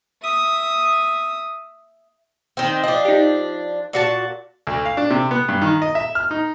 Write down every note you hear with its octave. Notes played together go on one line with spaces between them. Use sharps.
E5 D#6
D#3 C4
F3 D4 D#5
D#4 G4
A#2 F#4 A5
D2
F5
D4
C3
B3
G2
D#3
D#5
E5
F6
D#4